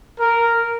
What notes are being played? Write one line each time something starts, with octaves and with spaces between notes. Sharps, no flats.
A#4